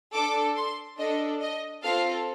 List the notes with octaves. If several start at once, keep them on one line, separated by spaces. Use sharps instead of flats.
D4 A4 D6
C6
D4 A4 D#5
D#5
C4 F4 A4 F5